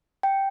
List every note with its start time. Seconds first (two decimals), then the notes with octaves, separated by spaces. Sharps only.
0.23 G5